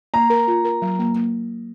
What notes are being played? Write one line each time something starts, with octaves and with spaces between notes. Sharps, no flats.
A#3 A#5
A#4
F4
A#4
F#3
A#3
A#3